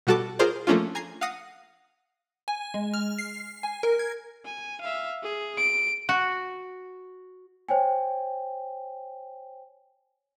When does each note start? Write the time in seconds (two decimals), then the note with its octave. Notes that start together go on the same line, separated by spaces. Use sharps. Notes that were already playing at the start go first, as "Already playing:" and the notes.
0.07 B2 G3 F#4 A4 A5 D6
0.39 F4 G#4 A#4 C5 D5
0.67 F3 A3 A#3 C#4 D4 F4
0.95 G#5 A#5 G#6 C7
1.21 F5 F#5 D#6 A#6 C7
2.48 G#5
2.74 G#3
2.94 F6
3.18 C7
3.63 G#5
3.83 A#4
3.99 G#6
4.45 G#5
4.81 E5 F5
5.23 G#4
5.57 D7
6.09 F#4
7.69 C5 C#5 G5 G#5